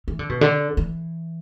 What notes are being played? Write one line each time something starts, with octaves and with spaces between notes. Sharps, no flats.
E3
D3
B2
D3
E3